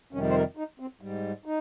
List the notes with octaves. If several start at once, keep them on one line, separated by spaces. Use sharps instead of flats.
F2 C3 D#3 G3 C#4
C5
A#4
D#4
C4
G#2 G3
D#4